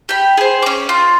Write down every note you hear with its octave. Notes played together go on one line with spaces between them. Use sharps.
G4 B5
G#4 C5
C#4 D6
F4